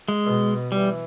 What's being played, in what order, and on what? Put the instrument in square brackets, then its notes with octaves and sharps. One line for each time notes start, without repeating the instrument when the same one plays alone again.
[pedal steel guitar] G#3
[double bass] B2
[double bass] E3 [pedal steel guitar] G3